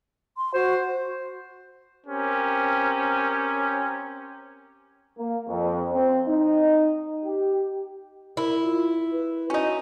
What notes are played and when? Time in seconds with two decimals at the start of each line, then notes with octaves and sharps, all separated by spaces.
0.37 C6
0.54 F#4 C5
2.07 C4 C#4 G4 A#4
5.18 A#3
5.48 F2
5.91 C4
6.27 D#4
7.24 G4
8.37 E4 A#4
8.63 F4
9.12 B4
9.50 C#4 D#4 F#4